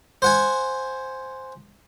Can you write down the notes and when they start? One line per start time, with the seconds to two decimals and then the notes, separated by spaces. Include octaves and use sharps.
0.22 C5 F#5 G#5